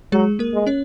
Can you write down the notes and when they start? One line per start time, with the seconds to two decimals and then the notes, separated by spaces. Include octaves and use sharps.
0.12 F#3 G#3 G#4
0.39 A#3 A#4
0.54 G#3
0.67 C#4 C#5